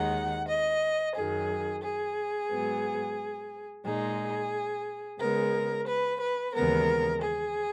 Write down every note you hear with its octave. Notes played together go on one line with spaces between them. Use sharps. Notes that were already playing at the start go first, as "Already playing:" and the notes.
Already playing: D#2 D#3 G#3 D#4 F#5
D#5
F#2 D#3 F#3 G#4
G#4
G#2 F#3 B3
A#2 G#3 D#4 G#4
C#3 G#3 B3 A#4
B4
B4
D#2 C#3 E3 G#3 B3 A#4
G#4